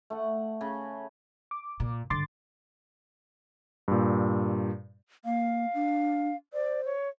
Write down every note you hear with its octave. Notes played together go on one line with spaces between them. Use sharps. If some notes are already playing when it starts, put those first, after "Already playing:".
A3 F#5
C#3
D6
A#2
G2 D3 C6 D6 A6
G2 A#2
A#3 F5
D4
C5 D5
C#5